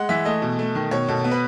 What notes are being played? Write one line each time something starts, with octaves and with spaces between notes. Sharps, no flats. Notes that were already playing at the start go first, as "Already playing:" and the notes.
Already playing: G#3 F#5
E3 E5
A3 D#5
B2
A3
D#3
B2 C#5
B2 A4
B3
B4